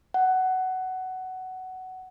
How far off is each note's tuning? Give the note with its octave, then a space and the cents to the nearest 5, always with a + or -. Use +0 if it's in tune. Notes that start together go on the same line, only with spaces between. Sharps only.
F#5 +15